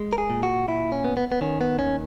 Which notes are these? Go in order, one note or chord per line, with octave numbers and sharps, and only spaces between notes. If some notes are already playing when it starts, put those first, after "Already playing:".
Already playing: G#3
A#4
G#4
A#2
F#4
A#2 E4
C#4
B3
B3
B3
D#3 C#4
B3
D#2 C#4